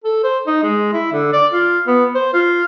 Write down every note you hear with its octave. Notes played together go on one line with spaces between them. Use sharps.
A4
C5
D#4
G#3
E4
D3
D5
F4
B3
C5
F4